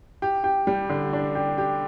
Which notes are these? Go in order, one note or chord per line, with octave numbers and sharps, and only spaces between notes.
G4
G4
G3
D3
D4
G4
G4